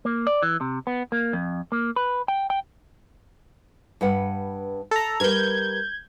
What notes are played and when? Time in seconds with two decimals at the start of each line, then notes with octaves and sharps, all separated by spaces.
0.05 A#3
0.27 D5
0.43 E3
0.61 C3
0.87 B3
1.12 A#3
1.33 F2
1.72 A#3
1.96 B4
2.28 G5
2.50 G5
4.01 G2 B4 F#5
4.91 A4 A#5
5.20 G3 A#4 B4 G6 G#6